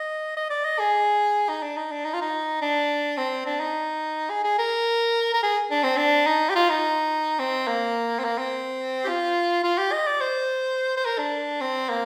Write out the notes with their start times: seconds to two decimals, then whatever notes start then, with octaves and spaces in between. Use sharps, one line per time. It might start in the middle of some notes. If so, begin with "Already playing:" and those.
Already playing: D#5
0.37 D#5
0.50 D5
0.65 D#5
0.79 G#4
1.49 D#4
1.62 D4
1.77 D#4
1.92 D4
2.05 D#4
2.13 F4
2.21 D#4
2.62 D4
3.17 C4
3.46 D4
3.60 D#4
4.30 G#4
4.44 G#4
4.59 A#4
5.34 A#4
5.43 G#4
5.71 D4
5.84 C4
5.97 D4
6.27 D#4
6.50 G4
6.55 F4
6.70 D#4
7.39 C4
7.67 A#3
8.19 C4
8.24 A#3
8.38 C4
9.04 G4
9.08 F4
9.64 F4
9.78 G4
9.92 D#5
10.07 D5
10.21 C5
10.97 C5
11.05 A#4
11.18 D4
11.61 C4
11.90 A#3